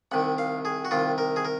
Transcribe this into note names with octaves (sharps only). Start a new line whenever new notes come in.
C2 C3 D#3 F#5
F5
G#4
F#4
C2 C3 D#3 F4
A#4
G#4
A#4